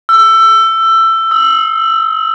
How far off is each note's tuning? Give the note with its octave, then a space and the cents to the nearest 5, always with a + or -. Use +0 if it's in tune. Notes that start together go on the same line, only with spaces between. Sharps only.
E6 +20
E6 -45